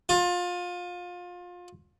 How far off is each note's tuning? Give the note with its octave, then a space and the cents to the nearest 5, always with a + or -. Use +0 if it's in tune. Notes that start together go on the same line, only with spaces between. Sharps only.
F4 +25